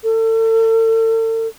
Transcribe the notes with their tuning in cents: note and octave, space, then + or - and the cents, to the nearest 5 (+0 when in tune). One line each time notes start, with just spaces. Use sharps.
A4 +40